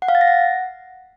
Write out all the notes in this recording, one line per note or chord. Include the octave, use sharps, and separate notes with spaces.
F#5
F5
A6
A#6
F#5